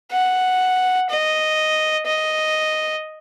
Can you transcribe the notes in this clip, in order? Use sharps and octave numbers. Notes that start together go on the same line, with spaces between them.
F#5
D#5
D#5